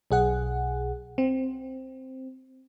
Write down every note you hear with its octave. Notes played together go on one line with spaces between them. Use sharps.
B1 G#4 F#5
C4